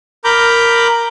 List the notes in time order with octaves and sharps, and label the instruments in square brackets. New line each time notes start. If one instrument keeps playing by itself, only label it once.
[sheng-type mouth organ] A#4 A#5 B5 D6 G6